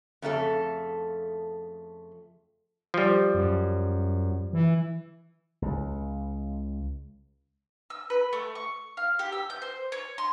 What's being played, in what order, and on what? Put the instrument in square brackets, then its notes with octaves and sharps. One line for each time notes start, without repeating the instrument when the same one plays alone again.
[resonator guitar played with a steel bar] F2 C#3 A3 A4
[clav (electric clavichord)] F3 G3
[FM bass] F#2
E3
[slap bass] C#2
[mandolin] E6
B4
A3
C#6
F5
G4
E6
G6
C5
C#5
C6